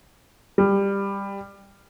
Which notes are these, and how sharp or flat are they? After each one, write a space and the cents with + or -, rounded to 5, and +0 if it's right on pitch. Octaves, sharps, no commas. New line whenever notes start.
G3 +15